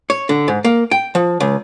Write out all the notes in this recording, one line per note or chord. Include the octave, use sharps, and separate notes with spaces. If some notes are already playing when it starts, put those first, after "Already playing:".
C#5
D3
G#2
A#3
G5
F3
C#2